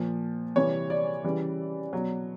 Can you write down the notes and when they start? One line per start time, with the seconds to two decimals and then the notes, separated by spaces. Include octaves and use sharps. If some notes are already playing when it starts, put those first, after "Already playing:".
Already playing: A#2 F3
0.56 C3 E3 G3 C#5
0.90 D5
1.24 C#3 E3 G3
1.93 B2 F#3